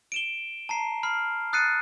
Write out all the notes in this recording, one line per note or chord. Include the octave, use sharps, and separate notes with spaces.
D7 E7 G7
A5 A#5 C7
B5 F6 C7
D#6 F#6 A6 C7 C#7 D#7